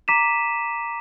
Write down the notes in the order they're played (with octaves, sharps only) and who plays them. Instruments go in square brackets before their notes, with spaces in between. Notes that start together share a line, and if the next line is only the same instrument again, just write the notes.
[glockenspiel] A#5 D6 B6 D#7 E7